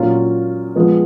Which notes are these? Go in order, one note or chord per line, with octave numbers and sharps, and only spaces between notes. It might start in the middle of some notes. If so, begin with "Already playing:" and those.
Already playing: A#2 F#3 C#4 F4
F3 G#3 B3